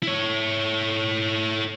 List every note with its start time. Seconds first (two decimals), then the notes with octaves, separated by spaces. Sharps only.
0.03 E4 C#5